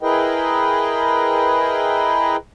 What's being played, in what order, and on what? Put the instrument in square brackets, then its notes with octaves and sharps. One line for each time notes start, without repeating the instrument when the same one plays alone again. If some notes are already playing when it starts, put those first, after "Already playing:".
[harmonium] E4 G#4 A#4 B4 D#5 G5